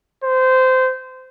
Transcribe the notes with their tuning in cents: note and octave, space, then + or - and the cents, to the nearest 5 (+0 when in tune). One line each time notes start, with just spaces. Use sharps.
C5 -20